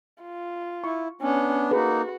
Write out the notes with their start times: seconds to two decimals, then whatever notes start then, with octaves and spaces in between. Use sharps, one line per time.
0.22 F4
0.84 E4 C#6
1.21 B3 C#4 D4
1.71 A#3 D#4 F#4 G#4 A4 B4